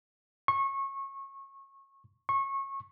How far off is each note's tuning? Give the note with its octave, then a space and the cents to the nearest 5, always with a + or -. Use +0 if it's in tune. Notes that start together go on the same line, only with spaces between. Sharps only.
C#6 -25
C#6 -25